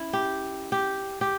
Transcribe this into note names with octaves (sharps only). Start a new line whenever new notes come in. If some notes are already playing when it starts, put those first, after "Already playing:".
Already playing: C#4 E4
G4
G4
G4